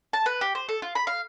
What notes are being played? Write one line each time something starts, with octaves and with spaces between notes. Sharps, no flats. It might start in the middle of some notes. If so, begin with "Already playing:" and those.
A5
B4
G4
C5
A4
F4
B5
F5